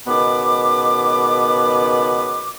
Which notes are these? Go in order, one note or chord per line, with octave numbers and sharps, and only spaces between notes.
C#2 B2 D#3 B3 B4 D6